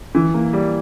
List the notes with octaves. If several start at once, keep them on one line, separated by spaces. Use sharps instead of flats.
E3
A#3
G3